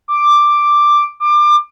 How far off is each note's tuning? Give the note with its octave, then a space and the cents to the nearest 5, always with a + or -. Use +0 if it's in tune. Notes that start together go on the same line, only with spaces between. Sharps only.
D6 +5
D6 +25